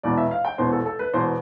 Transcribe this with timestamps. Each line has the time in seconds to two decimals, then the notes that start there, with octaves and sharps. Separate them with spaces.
0.03 E1 E2 B2 D5
0.17 E5
0.31 F5
0.45 G5
0.58 E1 E2 B2 C5
0.72 A4
0.86 A4
0.99 B4
1.14 E1 E2 B2 C5